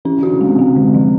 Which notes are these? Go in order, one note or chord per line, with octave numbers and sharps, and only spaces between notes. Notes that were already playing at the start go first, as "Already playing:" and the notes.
E3 C#4
D3
F#4
C#3
C3 G#3
C3 G#3
D3
F3